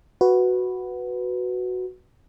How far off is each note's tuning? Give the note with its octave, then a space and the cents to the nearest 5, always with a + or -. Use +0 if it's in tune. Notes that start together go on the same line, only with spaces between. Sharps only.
F#4 +0 B4 +0